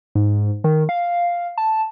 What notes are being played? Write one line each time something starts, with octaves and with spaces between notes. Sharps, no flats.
G#2
D#3
F5
A5